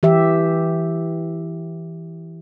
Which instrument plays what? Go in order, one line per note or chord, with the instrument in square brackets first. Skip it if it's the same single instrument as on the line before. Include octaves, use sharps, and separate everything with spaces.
[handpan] E3 G4 E5